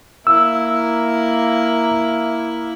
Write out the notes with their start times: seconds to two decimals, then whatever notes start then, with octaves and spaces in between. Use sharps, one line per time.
0.27 A#3 E4 E6